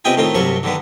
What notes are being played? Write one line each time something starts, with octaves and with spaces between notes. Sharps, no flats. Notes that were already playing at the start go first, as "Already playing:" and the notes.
C3 B3 F4 D#5 G5 G#5
A2 D#3 C4 F4
C2 G2 C3 F#3 A5 C#6
D3 D#3 B3